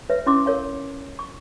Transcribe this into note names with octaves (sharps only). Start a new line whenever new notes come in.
B4 C#5 E5
C#4 E4 C6 D6
A#4 C#5 F5
C#6